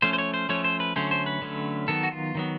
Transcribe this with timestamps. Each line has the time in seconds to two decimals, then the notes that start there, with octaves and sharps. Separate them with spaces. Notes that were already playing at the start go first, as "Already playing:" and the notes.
0.02 F3 A3 C#4 C5
0.13 C5
0.18 C#5
0.34 C5
0.49 F3 A3 C#4 C#5
0.64 C5
0.80 B4
0.96 D3 F#3 A3 C#4 C5
1.11 C5
1.26 B4
1.42 D3 F#3 A3 C#4
1.88 D#3 F#3 B3 A4
2.03 F#4
2.12 F4
2.35 D#3 F#3 B3